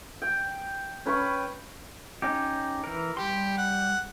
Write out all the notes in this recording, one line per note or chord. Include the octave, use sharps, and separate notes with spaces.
G5
C#4 B4 G5 C#6
C#4 D#4 G4
E3 A#4
G3 G4 C6
F#5